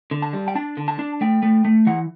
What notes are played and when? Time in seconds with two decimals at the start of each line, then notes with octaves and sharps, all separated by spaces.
0.11 D3
0.22 A5
0.33 G3
0.48 G5
0.55 D4 A5
0.77 D3
0.88 A5
0.99 D4
1.21 A3 G5
1.43 A3
1.65 A3
1.87 E3 F#5